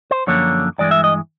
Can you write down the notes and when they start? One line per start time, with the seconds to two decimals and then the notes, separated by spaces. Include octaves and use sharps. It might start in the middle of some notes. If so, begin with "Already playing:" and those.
0.11 C5
0.27 F#2 D3 F3 A#3 C#5
0.78 G2 E3 G#3 D5
0.91 E5
1.04 D#5